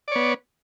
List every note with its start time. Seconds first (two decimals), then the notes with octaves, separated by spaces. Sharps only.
0.08 D5
0.12 C#5
0.16 B3